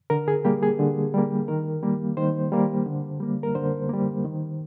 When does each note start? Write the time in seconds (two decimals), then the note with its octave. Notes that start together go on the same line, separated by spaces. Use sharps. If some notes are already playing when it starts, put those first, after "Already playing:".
0.10 D3 A#4
0.28 G#4
0.45 G3 A#3 G4
0.62 G#4
0.79 D3
1.14 G3 A#3
1.48 D#3 A#4
1.83 G3 A#3
2.17 D#3 C5
2.52 G3 A#3
2.86 D3
3.20 G3 A#3
3.43 A#4
3.55 D3 C5
3.89 G3 A#3
4.24 D#3